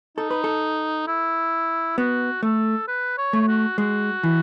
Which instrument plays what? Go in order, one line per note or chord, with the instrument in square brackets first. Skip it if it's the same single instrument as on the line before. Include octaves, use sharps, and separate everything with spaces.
[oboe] D#4 [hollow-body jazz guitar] A4
[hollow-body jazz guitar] B4
A4
[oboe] E4
[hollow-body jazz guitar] B3 [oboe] F#4
[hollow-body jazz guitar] A3 [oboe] A4
[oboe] B4
C#5
[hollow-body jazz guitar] A3
[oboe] F#4
[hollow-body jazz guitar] G#3 [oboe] F#4
[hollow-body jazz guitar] E3